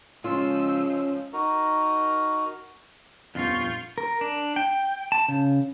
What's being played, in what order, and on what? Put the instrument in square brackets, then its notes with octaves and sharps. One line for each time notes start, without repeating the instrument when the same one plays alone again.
[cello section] C#3 F3 G#3 [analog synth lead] C#4 [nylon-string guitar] F4 [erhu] E6
[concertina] D#4 F#4 A#4
[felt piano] D#1 A#1 B3 [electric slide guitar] F2 [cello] F4 [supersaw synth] C#6 F6 G6
[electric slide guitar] A#4
D4
G5
A5
C#3